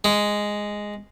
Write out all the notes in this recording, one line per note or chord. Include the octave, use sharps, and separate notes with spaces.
G#3